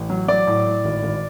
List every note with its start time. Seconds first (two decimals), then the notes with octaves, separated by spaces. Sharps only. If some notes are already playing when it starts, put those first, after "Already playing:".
Already playing: A1
0.10 F#3
0.28 F#3 D5 D6
0.47 A2
0.66 A2
0.84 G#1
1.03 G#1